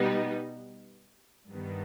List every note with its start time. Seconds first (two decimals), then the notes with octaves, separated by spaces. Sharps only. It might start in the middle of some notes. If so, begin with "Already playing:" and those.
Already playing: B2 G3 B3 D#4
1.50 G2 D#3 G3 B3